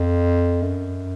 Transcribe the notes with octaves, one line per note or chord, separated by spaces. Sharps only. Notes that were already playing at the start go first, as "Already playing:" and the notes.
Already playing: F2
F#2